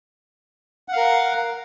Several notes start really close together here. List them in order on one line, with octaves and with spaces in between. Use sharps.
F#5 F5 A#4